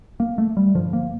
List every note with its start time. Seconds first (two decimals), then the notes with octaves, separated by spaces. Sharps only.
0.20 A#3
0.38 A3
0.57 G3
0.75 G2 D3 F3
0.93 A#3